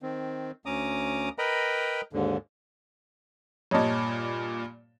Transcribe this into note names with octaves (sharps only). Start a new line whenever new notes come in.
D#3 C4
D2 C#4 A#5 D6 D#6
A#4 B4 D#5 G5 A#5 B5
D#2 G#2 D3
G2 A#2 C#5 D#5 A5